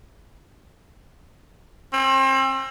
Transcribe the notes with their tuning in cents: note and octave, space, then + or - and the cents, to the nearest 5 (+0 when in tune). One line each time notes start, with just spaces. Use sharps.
C4 +35